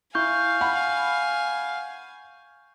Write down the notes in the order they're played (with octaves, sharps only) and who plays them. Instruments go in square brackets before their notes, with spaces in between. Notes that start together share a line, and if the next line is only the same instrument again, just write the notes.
[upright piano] E4 [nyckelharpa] F5 [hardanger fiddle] G#5 [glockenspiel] C#6 G6
[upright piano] F#5 B5